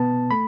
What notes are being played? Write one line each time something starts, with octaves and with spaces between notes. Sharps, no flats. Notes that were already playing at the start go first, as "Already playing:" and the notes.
Already playing: B2 B3 A5
A3 B5